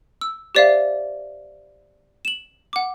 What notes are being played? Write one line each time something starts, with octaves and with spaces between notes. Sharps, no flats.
E6
G4 C5 D5 E5 F5
E7 F#7
F#5 D6